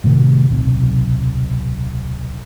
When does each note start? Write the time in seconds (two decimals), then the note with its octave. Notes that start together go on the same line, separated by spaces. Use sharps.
0.04 A2 C3 D#3 A3
0.50 D1 B1 C3